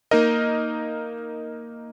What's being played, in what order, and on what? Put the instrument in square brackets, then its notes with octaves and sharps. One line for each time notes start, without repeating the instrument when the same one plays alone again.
[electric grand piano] A#3 D#4 A#4 D#5